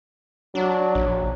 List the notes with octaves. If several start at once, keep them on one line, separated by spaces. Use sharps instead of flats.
F#3 D4
A#1